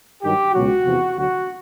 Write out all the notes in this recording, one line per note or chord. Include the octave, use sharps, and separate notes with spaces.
G2 D#3 F#3 G4
C#2 B2 F#3 F#4
E2 C3 F3
D2 D3 F#3 F#4